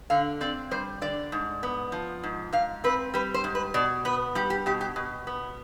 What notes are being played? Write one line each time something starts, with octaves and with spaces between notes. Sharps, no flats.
D3 F5
C4 D5
G3 C5
D3 D5
G#2
B3
F3
G#2
G#2 F5
C4 B4
G3 B4
C5
G#2
B4
B2 D5
B3 B4
G3 G4
G4
B2 G4
G4
B2
B3